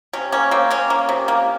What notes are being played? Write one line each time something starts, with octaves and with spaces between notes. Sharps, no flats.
C3 C#4
A#3 C#4
A#3 C4
A#3 C#4
A#3
C3
A#3